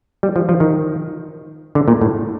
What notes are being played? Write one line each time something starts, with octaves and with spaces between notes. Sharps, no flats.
G3
F3
F3
D#3
D3
A#2
A2